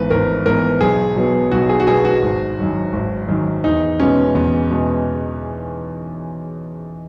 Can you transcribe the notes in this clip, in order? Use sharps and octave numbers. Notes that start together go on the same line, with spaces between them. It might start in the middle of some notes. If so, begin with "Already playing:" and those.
Already playing: G#1 G#2 E3 B3 B4
G#1 A#4
G#2 E3 B3 A#4
B1 G#4
B2 F#3 B3
B1 F#4
G#4
F#4
B2 F#3 B3 G#4
F#4
G#1
F#2 D#3 F#3
G#1
F#2 D#3 F#3
E2 D#4
B2 G#3 B3 C#4
E2 B3
B2 G#3 B3